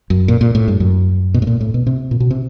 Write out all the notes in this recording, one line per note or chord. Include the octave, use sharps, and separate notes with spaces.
F#2
A#2
A#2
A2
G2
F#2
B2
A2
A#2
A2
B2
C3
A#2
B2
C3